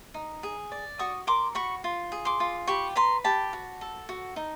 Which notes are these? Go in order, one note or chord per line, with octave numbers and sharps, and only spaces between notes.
D#4
G#4
D5
F#4 C#6 D#6
A#4 C6 D6
F#4 B5 C#6
F4
G#4
C6 D6
F4
G4 B5 C#6
B4 A#5 C6
G4 A5 B5
F#4
A4
F#4
D#4